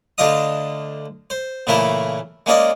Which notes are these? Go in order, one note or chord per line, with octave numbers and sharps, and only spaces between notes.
D2 D3 D4 F4 D#5 D#6
C5
A#2 C#3 E3 A3 E4 A#4
G#3 A#3 C#4 F4 D5 D#5